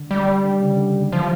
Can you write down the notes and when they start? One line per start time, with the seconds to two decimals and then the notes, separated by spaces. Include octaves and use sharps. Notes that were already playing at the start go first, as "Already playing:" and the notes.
Already playing: D3
0.11 G3
0.44 D3
0.61 C#3
0.79 D3
1.12 E3 F3